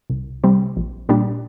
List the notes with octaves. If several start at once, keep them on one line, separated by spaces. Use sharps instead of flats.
C2
C3 G3 C4
A#1
A#2 G3 D4